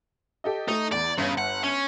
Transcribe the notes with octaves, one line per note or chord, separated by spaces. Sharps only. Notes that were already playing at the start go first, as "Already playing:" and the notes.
G4 A4 D#5
A3 D#4
E2 D5
G1 C#3
F#5
C#4